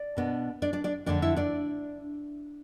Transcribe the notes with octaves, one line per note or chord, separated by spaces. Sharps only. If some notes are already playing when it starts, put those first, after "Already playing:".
Already playing: D5
B2 B3 D4
D4 D5
D4 D5
D4 D5
F2 D3 A3 D4 D5
E4 E5
D4 D5